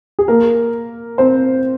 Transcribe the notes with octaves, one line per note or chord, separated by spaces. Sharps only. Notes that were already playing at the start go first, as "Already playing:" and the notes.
G#4
A#3 A#4
C4 C5